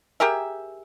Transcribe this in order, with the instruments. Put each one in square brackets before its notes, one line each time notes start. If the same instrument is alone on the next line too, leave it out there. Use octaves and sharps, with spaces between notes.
[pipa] G4 G#4 A#4 E5